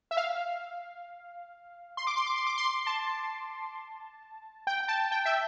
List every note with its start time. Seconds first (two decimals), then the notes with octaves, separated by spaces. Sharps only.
0.11 E5
0.17 F5
1.97 C6
2.07 D6
2.17 C6
2.26 D6
2.37 C6
2.47 D6
2.58 C6
2.87 A5
4.67 G5
4.88 A5
5.11 G5
5.25 E5